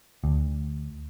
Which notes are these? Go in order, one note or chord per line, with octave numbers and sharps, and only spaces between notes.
D2